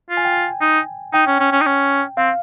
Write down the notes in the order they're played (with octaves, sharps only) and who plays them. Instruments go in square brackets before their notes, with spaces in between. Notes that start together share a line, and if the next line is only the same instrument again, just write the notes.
[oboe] F4
[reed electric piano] G#5
G5
G#5
[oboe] D#4
[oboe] D#4 [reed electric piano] G5
[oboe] C#4
C#4
C#4
D#4
C#4
[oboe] C4 [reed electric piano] F5